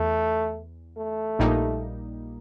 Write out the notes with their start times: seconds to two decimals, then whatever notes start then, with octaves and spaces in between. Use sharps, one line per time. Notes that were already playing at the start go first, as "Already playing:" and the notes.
Already playing: E2 A3
0.97 A3
1.39 A#1 A#2 G3 A#3 D#4